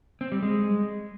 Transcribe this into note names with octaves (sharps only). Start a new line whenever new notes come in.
C4
G3
G#3